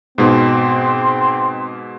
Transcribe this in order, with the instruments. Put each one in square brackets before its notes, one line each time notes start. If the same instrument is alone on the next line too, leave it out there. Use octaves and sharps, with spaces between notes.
[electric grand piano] G#2 B2 [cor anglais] C4